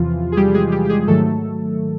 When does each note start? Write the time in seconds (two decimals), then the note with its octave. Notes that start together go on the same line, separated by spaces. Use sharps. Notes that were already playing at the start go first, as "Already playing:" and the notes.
Already playing: E2 C3 E3 F3 F4
0.32 G#4
0.37 G3 G4
0.54 G#3 G#4
0.72 G3 G4
0.85 G4
0.90 G#3 G#4
1.08 G#2 D#3 F#3 A3 A4